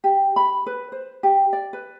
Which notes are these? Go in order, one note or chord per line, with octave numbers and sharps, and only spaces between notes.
G4
B5
B4
C5
G4
D5
B4